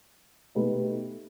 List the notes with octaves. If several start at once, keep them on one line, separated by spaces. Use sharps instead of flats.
B2 A3 D#4 G4 B4